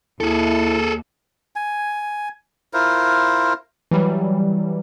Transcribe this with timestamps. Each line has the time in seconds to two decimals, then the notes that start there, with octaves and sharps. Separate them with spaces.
0.21 D#2 E4 G#4 A4
1.56 G#5
2.73 E4 F4 A#4 C5
3.91 E3 F#3 G3